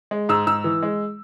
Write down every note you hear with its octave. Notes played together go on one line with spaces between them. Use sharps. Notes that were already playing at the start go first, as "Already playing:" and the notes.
G#3
G#2 E6
G#2 E6
E3
G#3